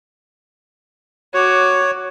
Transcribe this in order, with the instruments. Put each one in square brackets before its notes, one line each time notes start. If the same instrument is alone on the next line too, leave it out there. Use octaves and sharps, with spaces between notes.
[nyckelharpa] F#4 D6 [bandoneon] C#5